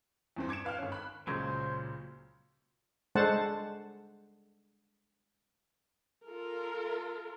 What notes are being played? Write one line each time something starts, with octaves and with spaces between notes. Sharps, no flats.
E2 G2 C4
D6 G#6 C#7 D7 E7
B4 F5 G5 F6
G#1 C#4
B5 F#6
C#2 A#2 C#3 F#3 C5 G#6
G#3 D4 A4 C5 F#5 A5
F4 A4 A#4